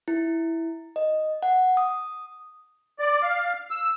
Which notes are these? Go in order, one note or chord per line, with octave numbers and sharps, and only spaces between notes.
E4
D#5
F#5
D#6
D5
F5
E6